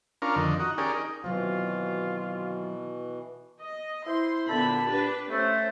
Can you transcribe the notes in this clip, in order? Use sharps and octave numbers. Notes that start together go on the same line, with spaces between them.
C#4 D4 F4 A#4
F2 D3 D#3
D#4 F#4
C#4 G4 G#4 A#4 D5
D#4
B2 D#3 E3 F#3 C4 F4
D#5
E4 C5 C6
A#2 D3 B3 A5 B5
D4 G4 B4
A3 C#4 C5